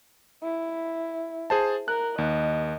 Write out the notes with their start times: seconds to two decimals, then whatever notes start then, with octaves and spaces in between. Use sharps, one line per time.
0.43 E4
1.50 G#4 C5 A5
1.88 A#4 F#6
2.18 D#2 D#5